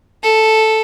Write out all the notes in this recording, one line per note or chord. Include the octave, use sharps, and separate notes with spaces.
A4